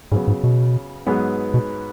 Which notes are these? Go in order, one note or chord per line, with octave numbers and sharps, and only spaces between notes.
G#2 C#3 F#3 B3
G#2
B2
G#2 F#3 B3 G#4 B4
B2